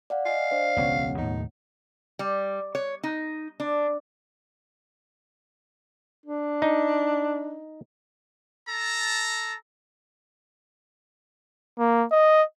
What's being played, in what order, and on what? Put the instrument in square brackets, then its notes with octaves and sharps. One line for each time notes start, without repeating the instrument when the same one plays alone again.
[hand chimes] D5 F5 F#5
[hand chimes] D#5 G#5 [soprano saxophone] F5
[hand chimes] D4 C5 D5
[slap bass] E1 C#2 C#4 [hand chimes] B3 C#5 F#5
[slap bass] D#2 A2 [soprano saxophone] D#4
[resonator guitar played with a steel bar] G3
C#5
D#4
D4
[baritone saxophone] D4
[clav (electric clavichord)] D#4
[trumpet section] A4 A5 A#5
[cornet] A#3
D#5